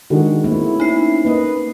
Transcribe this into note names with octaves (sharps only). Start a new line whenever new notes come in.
D#3 G#3 D4 F#4
A3 A#3 C4 E4
C#4 D#4 C7
A#3 B4 D#5